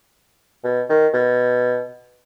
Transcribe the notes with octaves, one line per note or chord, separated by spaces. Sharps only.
B2
D#3
B2